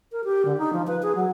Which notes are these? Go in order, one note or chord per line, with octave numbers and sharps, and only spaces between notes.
A#4
G4
D3
D#4
F3
B4
G#4
F#3